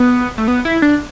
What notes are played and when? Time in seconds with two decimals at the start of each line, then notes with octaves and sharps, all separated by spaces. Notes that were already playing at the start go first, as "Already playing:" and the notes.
Already playing: B3
0.38 A3
0.48 B3
0.65 E4
0.82 D4